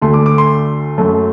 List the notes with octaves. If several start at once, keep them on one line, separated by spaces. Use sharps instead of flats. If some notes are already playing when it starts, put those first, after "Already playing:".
D2 D3 A3 C6
D6
D6
C6
F#2 F#3 A3